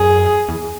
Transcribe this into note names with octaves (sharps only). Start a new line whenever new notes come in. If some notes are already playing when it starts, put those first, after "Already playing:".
Already playing: F#2 G#4
E2